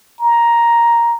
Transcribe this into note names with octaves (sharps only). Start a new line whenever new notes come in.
A#5